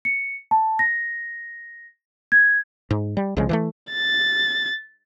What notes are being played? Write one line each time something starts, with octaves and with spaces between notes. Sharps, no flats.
C#7
A5
A#6
G#6
G#2
G3
C2 C#3 F3 G#3
E3 F3 A3
A6